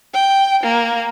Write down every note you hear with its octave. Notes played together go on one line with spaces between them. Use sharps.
G5
A#3